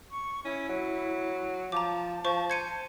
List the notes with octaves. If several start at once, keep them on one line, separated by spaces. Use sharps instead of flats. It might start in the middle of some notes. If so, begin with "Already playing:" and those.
C#6
C#4 E4
F#3
F3 A5 A#5 D6
F3 C5 C#6
C5 G#6 C#7 D#7